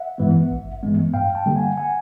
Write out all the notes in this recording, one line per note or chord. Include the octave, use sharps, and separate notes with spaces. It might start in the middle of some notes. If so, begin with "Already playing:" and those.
Already playing: E5 F#5
G2 E3 G#3 B3
G#1
G2 E3 G#3 B3
G2 F5 G5
G5 A5
D3 G3 A#3
F#5 G#5
F#5 G#5